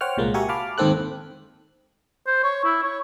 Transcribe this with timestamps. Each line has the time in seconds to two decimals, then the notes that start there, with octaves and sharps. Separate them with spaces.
0.01 C5 C#5 F#5 G5 F6
0.17 C2 A#2 G#3 A#3
0.34 F#4 G4 A#4 E5 G#5 C#6
0.49 F5 A5 B5 D6 F6
0.78 D#2 G#2 D#3 C4 A4 F#6
2.27 C5
2.43 C#5
2.64 E4
2.82 C#5